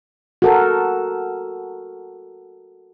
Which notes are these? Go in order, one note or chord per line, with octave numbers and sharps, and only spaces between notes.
F#4 A4 A#4